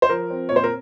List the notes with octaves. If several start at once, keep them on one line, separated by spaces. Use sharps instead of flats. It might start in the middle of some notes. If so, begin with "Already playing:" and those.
C5
F3 A#4
C4
A#2 C#5
C5
A#4